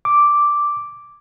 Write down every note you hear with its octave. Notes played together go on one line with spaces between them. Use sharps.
D6